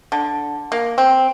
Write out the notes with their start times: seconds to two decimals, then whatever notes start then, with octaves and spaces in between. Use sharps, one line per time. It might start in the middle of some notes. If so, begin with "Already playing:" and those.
0.12 D3
0.72 A#3
0.98 C4